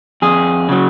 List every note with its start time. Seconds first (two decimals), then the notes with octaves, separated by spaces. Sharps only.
0.22 F2 G#4
0.69 C#3 F#3